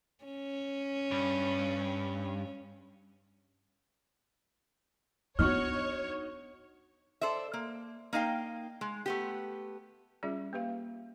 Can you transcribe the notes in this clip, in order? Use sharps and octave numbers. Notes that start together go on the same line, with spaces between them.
C#4
G2
B3 D4 D#4 F#4 C#5 C#6 F6
A4 C5 D5 E5
A#3
A#3 D#4 F5 G5
G#3
A3 B3 G4
G3 C#4 F4 G#4 D5 E5
A#3 G4 B4 F5